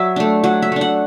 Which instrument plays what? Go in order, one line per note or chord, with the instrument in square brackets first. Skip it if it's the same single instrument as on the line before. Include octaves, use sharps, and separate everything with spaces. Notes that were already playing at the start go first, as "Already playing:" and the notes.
Already playing: [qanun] F#3 E5
A3 D4
F#3 F#5
E5
A3 D4
F#5